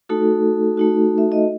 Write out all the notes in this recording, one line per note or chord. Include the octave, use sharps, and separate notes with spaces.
A3 D#4 F#4 A4
A3 D#4 F#4
E5
D#5